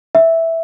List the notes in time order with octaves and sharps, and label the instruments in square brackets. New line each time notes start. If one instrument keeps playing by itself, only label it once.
[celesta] E5